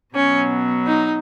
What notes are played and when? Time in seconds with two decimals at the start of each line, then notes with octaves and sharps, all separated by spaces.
0.16 B2 F#3 C#4
0.86 D#4